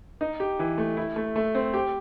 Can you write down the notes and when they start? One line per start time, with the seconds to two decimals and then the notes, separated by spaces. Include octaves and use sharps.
0.21 D#4
0.40 G4
0.59 E3
0.78 A3
0.97 E4
1.16 A3
1.36 A3
1.55 C4
1.74 G4